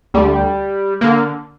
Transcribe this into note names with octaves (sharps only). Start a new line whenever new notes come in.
D2 D3 G3
D3 A#3